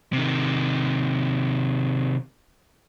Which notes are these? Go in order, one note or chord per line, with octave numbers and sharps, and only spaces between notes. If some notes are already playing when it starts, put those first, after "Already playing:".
C3 D#3